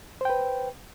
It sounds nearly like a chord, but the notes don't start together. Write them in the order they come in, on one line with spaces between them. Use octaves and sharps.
C5 G5 B4